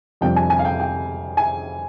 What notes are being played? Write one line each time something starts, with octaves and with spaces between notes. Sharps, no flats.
F2 C3 G3 D4 G5
G#5
G#5
F5
G5
G5
G#5